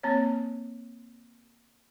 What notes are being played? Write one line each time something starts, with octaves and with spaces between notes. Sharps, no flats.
A#3 C4 C#5